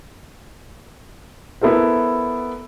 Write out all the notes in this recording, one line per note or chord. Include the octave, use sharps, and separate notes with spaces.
B3 E4 A4 A#4 C5